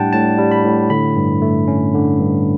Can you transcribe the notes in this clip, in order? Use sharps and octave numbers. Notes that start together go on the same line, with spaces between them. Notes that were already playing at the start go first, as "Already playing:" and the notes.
Already playing: A2 G3 D4 F#5 G5 A5
A2 A5
G3
B5
A2
D3 B5
G2
A3
C#4
D3
G2